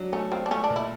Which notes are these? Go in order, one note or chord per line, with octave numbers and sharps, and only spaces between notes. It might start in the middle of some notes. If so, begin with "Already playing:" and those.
Already playing: F#3 D4
A3 C#4
C4 F4
D4
A3 C#4
D4
A#2
E4